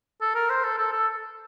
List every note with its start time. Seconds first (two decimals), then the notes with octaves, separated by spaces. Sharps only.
0.21 A4
0.35 A#4
0.50 C5
0.63 A4
0.78 A4
0.92 A4